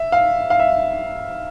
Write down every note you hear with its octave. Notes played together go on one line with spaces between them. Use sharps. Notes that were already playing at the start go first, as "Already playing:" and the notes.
Already playing: E5
F5
F5
E5